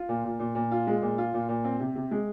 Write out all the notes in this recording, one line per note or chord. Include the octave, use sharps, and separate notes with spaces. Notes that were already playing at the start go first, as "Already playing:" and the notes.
Already playing: F4
A#2
A#2
A#2
A#2
F4
G#3
A#2
F4
A#2
A#2
C4
C3
C3
G#3